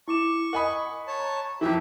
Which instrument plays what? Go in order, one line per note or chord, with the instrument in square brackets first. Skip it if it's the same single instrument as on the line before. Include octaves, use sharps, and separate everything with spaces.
[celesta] E4 D6 E7 [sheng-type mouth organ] C#6
[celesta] A#4 D#5 D#6 [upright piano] F#5 G#5 B5
[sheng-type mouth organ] C#5 A5
[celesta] A#5
[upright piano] F2 E3 [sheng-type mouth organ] G4 E5